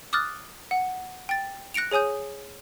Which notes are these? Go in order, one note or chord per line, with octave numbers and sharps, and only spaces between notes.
D6 D#6 F6 F#6 A6
F#5
G5 A6
F#6 A#6 C#7 D7 F7
G#4 C#5 G#5 D#6 G6